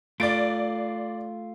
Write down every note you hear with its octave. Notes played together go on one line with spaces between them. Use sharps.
A3 F4 D5 A6 D7